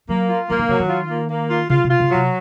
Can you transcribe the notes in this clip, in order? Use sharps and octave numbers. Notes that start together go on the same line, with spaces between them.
F#3 A#3
F4
F3 A#3
D#3
C#3 F#3
D#3
F4
A#3
A#3
F4
C#3 F4
C3
F4
C#3
C3 F#3